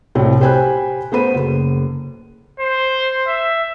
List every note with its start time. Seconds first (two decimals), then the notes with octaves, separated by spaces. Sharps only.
0.15 C2 A2 C4 C#5
0.40 G4 C5 G5 G#5 B5 F#6
1.12 A3 B3 C5 B5 D#7
1.35 F#1
2.60 C5
3.28 E5